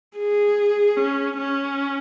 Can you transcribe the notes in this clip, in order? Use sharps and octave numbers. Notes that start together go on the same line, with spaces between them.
G#4
C#4
C#4